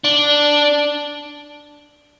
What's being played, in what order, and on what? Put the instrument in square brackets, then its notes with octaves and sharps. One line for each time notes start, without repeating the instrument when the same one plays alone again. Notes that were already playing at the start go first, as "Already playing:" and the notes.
[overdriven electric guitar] D4